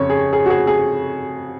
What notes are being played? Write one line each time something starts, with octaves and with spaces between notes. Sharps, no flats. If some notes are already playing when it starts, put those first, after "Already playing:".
Already playing: F2 C#3 C#5
G#4
G#4
F#4
G#4
G#4